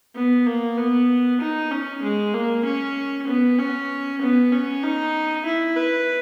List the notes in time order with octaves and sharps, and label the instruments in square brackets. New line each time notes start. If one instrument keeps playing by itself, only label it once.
[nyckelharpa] B3
A#3
B3
D#4
C#4
G#3
A#3
C#4
B3
C#4
B3
C#4
D#4
E4
B4